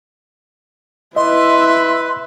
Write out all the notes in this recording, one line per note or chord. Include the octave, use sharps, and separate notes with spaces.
E4 B4 D#5 E5 C6